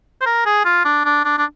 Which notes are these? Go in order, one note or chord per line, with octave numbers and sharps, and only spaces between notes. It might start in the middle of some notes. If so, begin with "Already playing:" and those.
C5
A#4
G#4
F4
D4
D4
D4
D4